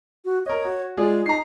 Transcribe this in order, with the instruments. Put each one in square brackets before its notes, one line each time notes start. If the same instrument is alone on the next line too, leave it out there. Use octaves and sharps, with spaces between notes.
[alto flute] F#4
[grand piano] A#4 D#5 [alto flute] C#5
[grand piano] F#4
[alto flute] G#3 [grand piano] F4 G#4 D5
[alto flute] D#4 [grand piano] A#5 C7